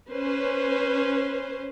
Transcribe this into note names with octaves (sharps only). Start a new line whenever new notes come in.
C#4 B4 C5